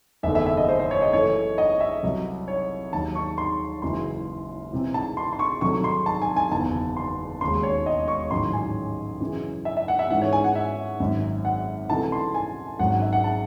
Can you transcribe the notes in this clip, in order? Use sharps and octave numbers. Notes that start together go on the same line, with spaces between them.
F#1 E2 D#3 A3 E5
E5
E5
D#5
C5
C5
C#5
D#5
F#2 E3 A3 C#5
D#5
E5
C2 C3 F#3
C#5
D#2 D#3 F#3 A5
C#6
C6
F#1 F#2 E3 G#3 C6
C2 C3 E3 C4
A5
C6
C6
C#6
C2 C3 D#3 F#3 A3 C#6
C6
A5
G#5
G#5
F#1 E2 D#3 A5
C6
E1 D#2 D#3 G#3 C#4 C6
C#5
D#5
C#6
A1 G#2 D#3 F#3 C#4 C6
G#5
F#2 C#3 E3
E5
E5
F#5
E5
G#2 E3 G#3 C#4 F#5
C#5
G#5
F#5
E5
G#1 F#2 D#3
F#5
C2 C3 E3 A3 C#4 A5
C6
G#5
G#1 G#2 F#3 C#4 F#5
F#5
E5
F#5
A5